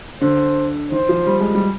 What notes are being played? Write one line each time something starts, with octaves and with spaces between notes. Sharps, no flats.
D3 C5
D#3 C5
F3
G3
G#3
G3